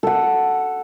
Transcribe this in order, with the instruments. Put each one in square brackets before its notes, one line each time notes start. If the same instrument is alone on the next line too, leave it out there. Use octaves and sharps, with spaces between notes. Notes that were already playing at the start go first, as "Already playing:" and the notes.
[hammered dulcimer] A4 F#5